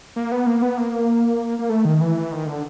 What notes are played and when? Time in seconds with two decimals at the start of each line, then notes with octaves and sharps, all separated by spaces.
0.16 A#3
0.32 B3
0.47 A#3
0.62 B3
0.77 A#3
1.59 A#3
1.70 A3
1.85 D#3
2.01 E3
2.32 D#3
2.47 D3